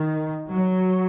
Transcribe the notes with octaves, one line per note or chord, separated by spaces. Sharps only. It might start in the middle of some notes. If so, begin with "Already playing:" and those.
Already playing: D#3
F#3